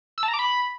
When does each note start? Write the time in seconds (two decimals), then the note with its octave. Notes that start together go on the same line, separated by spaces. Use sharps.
0.18 E6
0.23 A5
0.28 A#5
0.34 D6
0.39 B5